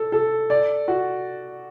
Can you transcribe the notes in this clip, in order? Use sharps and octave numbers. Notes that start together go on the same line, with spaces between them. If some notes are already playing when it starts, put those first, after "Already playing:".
Already playing: A4
A4
D5
F#4